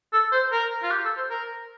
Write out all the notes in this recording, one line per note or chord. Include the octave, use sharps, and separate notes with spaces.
A4
C5
A#4
F4
G4
A4
C5
A#4